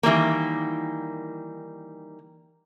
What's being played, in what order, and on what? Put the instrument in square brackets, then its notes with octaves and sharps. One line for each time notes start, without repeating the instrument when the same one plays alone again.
[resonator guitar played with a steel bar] D#3 E3 G3 A#3